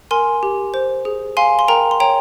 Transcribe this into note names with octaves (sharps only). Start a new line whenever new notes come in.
A#4 G#5 C6
G4
C5
G#4
F5 G#5 C6
C6
A#4 G5 A#5
C6
C#5 G5 A#5